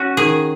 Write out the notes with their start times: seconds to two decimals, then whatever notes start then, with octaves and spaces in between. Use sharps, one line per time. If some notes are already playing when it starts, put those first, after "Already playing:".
Already playing: C#4 F#4
0.17 D#3 G#4